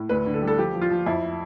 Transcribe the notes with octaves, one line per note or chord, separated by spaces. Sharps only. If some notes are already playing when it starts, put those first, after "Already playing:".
Already playing: A2
D2 B4
D3
A4
G3
A4
F3 G4
F3
F4
F3
F2 E4